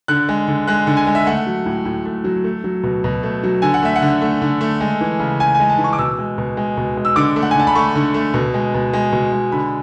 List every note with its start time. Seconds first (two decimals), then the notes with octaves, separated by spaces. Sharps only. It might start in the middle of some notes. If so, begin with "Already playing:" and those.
0.08 D3 F#6
0.29 G#3
0.48 D3
0.68 G#3 F#6
0.87 D3
0.97 G#5
1.07 G#3
1.15 E5
1.27 A3 F#5
1.47 F#3
1.66 A2
1.85 A2
2.06 A3
2.24 F#3
2.44 A3
2.64 F#3
2.84 B2
3.04 B2
3.23 A3
3.44 F#3
3.62 D3 G#5
3.74 F#5
3.83 A3 E5
3.96 F#5
4.02 D3
4.22 A3
4.42 D3
4.61 A3
4.80 G#3
5.01 E3
5.19 C#3
5.40 C#3 G#5
5.55 G#5
5.60 G#3
5.69 A5
5.78 E3
5.84 C#6
5.93 D6
5.98 B2 E6
6.18 G#3
6.38 B2
6.57 G#3
6.77 B2
6.97 G#3
7.05 E6
7.16 D3 D6
7.36 A3
7.42 F#5
7.51 G#5
7.56 D3 A5
7.67 B5
7.75 A3 C#6
7.95 D3
8.14 A3
8.34 B2
8.54 G#3
8.74 B2
8.93 G#3
9.13 B2
9.33 G#3
9.52 D3 B5